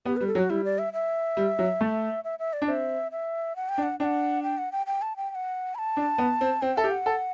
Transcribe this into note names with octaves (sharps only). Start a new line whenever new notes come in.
B3 G4
G3 B4
A4
F#3
F#4
G3 E4
D5
E5
E5
G3
F#3
A3
E5
E5
D5
D4
C4 E5
E5
F#5
G5
D4
F#5
D4 F#5 G5
G5
F#5
G5
G5
A5
G5
G5
F#5
B5
A5
D4
B3
C4
C4 G5
A4 E5
G4
F#5
A4